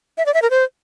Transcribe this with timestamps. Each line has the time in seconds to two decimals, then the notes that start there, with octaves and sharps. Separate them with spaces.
0.18 E5
0.26 D5
0.34 E5
0.42 A#4
0.50 C5